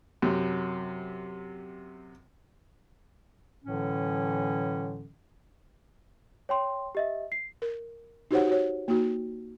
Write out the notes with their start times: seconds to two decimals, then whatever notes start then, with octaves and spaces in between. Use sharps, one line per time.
0.22 F#2 C3
3.65 A2 D3 E3 F#3 C#4
6.49 C#5 G5 C6
6.95 G4 D#5 E5
7.32 C7
7.62 A#4
8.31 D#4 F#4 G4 C5 C#5 F#5
8.47 F#4 C#5
8.88 A#3 D#4 F#4